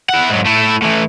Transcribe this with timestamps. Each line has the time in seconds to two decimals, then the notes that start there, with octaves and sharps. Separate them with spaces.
0.10 E4 F#5
0.30 G#2 F#3
0.46 A3 E4
0.82 A2 E3